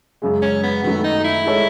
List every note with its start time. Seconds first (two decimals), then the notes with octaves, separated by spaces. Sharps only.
0.22 F#2 C#3 G#3
0.42 C#4
0.63 B3
0.84 F#2 D#3 F#3 A3 B3
1.04 D#4
1.24 E4
1.45 G#3 D#4 A4 C#5